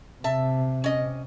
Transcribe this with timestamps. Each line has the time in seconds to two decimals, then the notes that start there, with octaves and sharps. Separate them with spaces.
0.24 C3 E5 A5
0.84 C#4 D#5